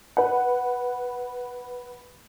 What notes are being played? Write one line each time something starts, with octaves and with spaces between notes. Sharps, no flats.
B4 F#5